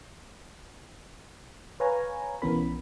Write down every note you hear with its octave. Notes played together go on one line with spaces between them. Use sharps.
B4 C#5 F5 G#5 A#5
B1 E3 B3 C#4 A#4 B5